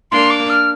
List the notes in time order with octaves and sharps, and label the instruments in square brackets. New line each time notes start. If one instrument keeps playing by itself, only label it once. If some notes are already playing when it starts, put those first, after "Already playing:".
[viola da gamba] A#3 D4 [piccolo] C6
[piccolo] D6
F6